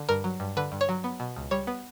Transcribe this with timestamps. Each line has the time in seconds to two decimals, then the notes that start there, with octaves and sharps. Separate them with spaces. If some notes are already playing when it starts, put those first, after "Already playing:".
Already playing: D3
0.09 G2 A#4
0.24 F#3
0.40 G2
0.57 D3 B4
0.72 G2
0.81 C#5
0.89 F#3
1.04 B3
1.20 B2
1.36 C#2
1.51 G3 C#5
1.67 B3